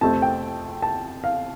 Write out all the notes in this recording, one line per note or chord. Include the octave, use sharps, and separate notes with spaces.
F2 C3 A3 C4 A5
G5
A5
F5